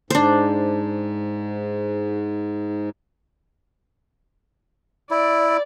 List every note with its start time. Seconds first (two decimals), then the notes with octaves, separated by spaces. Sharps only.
0.10 G#2 D4 C5
5.11 E4 D5